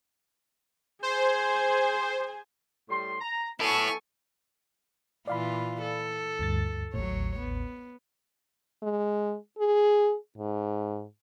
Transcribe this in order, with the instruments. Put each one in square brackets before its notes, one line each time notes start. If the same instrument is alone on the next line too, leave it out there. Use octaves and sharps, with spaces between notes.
[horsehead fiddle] G#4 G#5 [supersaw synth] C5
[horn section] A2 G3 C6
A#5
[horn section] F#3 B3 A4 [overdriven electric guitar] E4 A5 [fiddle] G#5 C#6
[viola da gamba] A#2 E3 F4 [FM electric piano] D5 F5 B5
[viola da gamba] A4
[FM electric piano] D2 G2 A6
[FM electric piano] A1 D#2 A2 [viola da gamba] F#3 C#5
[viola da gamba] B3
[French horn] G#3
G#4
G#2